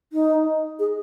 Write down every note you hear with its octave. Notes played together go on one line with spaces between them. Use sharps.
D#4
G#4